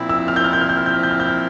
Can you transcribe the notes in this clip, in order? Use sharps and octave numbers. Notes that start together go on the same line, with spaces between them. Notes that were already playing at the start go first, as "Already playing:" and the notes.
Already playing: A#2 F3 C4 E4
E6
F6
G6
F6
G6
F6
G6
F6
G6
F6
G6
F6
G6
F6